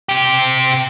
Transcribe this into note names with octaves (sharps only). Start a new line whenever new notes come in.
C3 G4